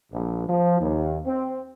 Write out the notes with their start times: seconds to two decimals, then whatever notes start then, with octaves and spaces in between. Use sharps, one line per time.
0.12 A#1
0.47 F3
0.80 D#2
1.26 C4